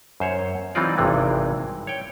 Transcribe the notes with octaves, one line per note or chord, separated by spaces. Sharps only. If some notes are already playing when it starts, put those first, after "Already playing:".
F#2 C5 C#5
E3 F#3 C4 D#4 F4 D5
G#1 G2 C3 E3 G#3
C#5 G5